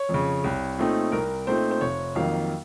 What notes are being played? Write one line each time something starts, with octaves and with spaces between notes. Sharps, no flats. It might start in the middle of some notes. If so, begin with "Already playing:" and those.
Already playing: C#5
F2 C#3
C2
A#2 A3 C4 D#4
C2 A#4
A#2 A3 C4 D#4 C5
C5
F1 C#5
F2 D#3 F#3 A#3 F5